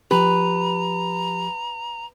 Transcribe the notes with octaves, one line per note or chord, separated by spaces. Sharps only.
F3 G4 B4 A#5